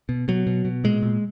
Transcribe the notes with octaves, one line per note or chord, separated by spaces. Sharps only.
B2
B2 F#3
B2
B2
A#2 G#3
A#2